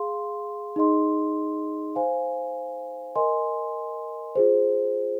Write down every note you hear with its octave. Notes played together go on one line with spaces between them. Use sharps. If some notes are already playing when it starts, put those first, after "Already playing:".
Already playing: G#4 F5 C6
D#4 G#4 D#5 C6
C5 F5 G#5
A#4 D#5 G#5 C6
F4 G#4 C5